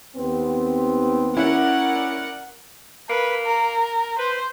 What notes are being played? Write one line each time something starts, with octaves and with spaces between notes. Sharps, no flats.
D#2 B3 C4
C#4 E4 A#4 D5 F#5
A#3 B4
A#4
B4 C5